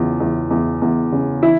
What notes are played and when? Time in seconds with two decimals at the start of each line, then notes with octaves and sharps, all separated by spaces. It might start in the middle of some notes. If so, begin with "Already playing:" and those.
Already playing: E2 C#3 F4
0.20 E2
0.51 E2
0.82 E2
1.12 C#3
1.43 E3 E4